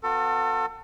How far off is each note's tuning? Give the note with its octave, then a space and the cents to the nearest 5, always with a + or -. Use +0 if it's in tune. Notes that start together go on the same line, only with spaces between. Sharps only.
B3 +35 F#4 -45 A4 +30